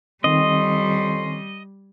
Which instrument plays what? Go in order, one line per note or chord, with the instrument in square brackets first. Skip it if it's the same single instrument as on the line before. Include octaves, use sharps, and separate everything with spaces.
[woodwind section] F2 C#4 C6 [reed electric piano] D#3 C4 [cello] G3 [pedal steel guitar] D#5